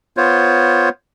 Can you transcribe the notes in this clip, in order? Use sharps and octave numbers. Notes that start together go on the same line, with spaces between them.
B3 F4 C5 C#5